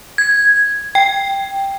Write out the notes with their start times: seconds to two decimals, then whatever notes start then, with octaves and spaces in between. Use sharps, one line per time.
0.18 G#6
0.95 G5